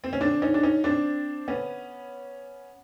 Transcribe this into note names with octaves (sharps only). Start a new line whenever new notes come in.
C4
C#4
C4 D4
C#4 D#4
D4
C#4 D#4
C4 D4
B3 C#4